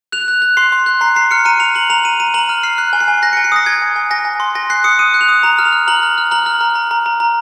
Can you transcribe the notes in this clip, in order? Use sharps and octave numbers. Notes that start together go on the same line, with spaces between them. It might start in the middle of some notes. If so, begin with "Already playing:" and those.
F#6 F7
F#6
F#6
C6 C7
C6
F#6
A#5 C7
A#5 C7
F6 C#7
A#5 D#7
A#5 F7
A#5 F#7
A#5 F7
A#5 D#7
A#5 D#7
A#5 F#7
F6
F6 C7
F#6 C7
G#5
C7
G#5
F#6 A#6
C#7
G#5
C7
D#6 A#6
G#5 G#6
G#5
G#5
G#5 A#6
G#5
C6
G#5 A#6
F#6 C7
D#6 C#7
D#6 D#7
F#6
F7
D#6
A#5 F7
F6
F7
F6
A#5 F#7
F6
F6
A#5 F#7
F6
A#5
A#5
A#5
A#5
A#5